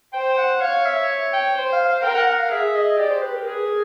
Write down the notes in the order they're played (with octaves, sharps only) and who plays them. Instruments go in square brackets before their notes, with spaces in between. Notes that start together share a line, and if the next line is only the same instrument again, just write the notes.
[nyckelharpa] C5 [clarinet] G5
[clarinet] F#5
[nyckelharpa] C#5 [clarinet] F5
[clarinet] E5
G5
[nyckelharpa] C5
[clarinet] F5
F5
[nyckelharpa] A#4 [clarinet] G5
[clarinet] F#5
F#5
F5
[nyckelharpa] G#4 [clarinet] E5
[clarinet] D#5
[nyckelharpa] G4 [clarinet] D5
[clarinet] C5
B4
A#4
[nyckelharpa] G#4 [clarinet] B4
[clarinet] A#4